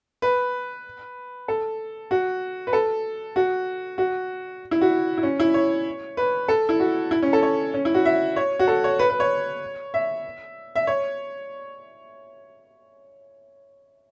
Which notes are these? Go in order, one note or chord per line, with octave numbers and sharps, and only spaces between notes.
B4
A4
F#4
B4
A4
F#4
F#4
E4
F#4
E4
C#4
E4
C#5
B4
A4
E4
F#4
E4
C#4
A4
C#5
C#4
E4
F#4
E5
C#5
F#4
A4
C#5
B4
B4
C#5
E5
E5
C#5